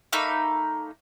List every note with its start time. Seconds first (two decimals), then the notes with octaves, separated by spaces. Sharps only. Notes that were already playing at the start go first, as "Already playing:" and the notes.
0.13 A3 A#3 D#4 B5